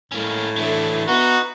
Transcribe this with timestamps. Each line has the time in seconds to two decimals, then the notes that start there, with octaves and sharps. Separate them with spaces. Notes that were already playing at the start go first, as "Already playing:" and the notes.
0.12 A2 G#3 A#3 C#4
0.57 E3 F#3 D4 A4 E5
1.08 B3 D#4 F#4 B4